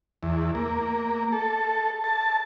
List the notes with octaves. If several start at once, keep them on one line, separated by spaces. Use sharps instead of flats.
E2
A#3
A4
A5